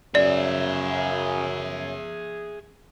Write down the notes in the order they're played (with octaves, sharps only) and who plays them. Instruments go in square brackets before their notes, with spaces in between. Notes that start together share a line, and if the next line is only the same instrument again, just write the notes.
[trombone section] F#2 C#3 [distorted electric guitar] G#4 E5 [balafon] D5